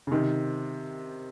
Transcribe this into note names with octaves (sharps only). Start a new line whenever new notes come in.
C#3
C3 D#3